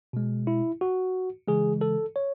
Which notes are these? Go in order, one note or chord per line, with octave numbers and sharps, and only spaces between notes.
B2 G#3
E4
F#4
C#3 E3 G#3 G#4
A4
C#5